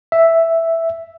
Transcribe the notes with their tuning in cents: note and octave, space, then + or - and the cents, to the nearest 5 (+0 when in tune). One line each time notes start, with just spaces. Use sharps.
E5 +0